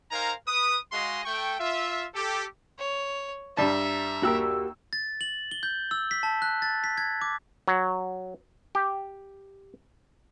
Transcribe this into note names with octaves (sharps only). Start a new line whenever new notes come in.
D#4 A#4 C5 F5 G#5 A#5
B4 D#6
G#3 F#4 G#4 D#5 F5 C6
A3 G5 C#6
F4 E5
G4 A4
C#5
G2 G3 E5 A5 A#5
D#2 F#4 G4 A#4 E6
A6
F#7
G7
G6
E6
B6
A5
F#6
A6
B6
G#6
D6
F#3
G4